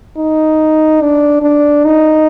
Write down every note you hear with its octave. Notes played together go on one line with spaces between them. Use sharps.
D#4
D4
D4
D#4